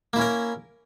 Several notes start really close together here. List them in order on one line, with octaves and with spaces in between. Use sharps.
A#3 E4 C#4 A#4